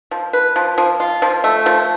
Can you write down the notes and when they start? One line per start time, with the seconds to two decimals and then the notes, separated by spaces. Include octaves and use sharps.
0.11 F3
0.33 B4
0.56 F3
0.78 F3
1.00 F4
1.22 F3
1.44 A3
1.66 F3